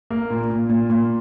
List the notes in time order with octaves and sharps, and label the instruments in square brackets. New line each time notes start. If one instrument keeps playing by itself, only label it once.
[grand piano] A#3
A#2
A#2
A#2
A#2